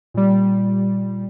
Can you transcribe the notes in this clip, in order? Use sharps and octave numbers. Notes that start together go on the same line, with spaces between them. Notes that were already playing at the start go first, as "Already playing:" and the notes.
A#2 G3